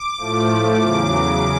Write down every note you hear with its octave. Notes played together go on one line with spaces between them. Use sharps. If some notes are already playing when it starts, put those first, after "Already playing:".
Already playing: D6
A2 F3 A3
E2 C#3 F#3 D6